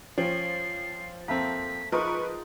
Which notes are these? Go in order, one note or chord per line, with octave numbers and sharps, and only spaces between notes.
F3 C#4 C5 G5 C7
F2 A3 A#3 C4 B6
F3 G#3 D#4 F4 A#4 B4 C#6